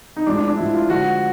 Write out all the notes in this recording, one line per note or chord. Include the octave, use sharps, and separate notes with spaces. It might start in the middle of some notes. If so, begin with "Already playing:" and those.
D#4
A2 F3 G#3 D4
D4
D4
A2 F3 G#3 E4
F4
D3 F3 G#3 F#4